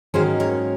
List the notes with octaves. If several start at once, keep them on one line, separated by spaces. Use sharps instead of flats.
G#2 D#3 F#3 A#3 C#4 G#4 C5
A#4 C#5